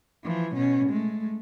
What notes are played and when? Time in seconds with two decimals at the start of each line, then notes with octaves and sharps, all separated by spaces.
0.23 E3 F3
0.54 B2 C#4
0.89 G#3 A3